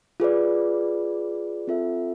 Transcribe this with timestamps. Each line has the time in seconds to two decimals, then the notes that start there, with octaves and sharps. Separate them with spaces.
0.20 F4 G#4 B4 D5
1.67 C4 F4 A4 E5